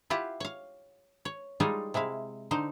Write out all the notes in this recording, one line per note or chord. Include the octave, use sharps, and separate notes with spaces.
E4 F4 G4 F#5
C#5 F5
C#5
G3 G#3 D#4 F4 G#4 A4
C3 G#3 E4 F5
D3 D#4 C5